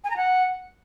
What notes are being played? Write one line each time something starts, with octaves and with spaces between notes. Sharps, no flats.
G#5
A#5
F#5